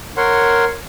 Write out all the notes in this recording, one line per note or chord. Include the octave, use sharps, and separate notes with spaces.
A#4 C#5 F#5 C6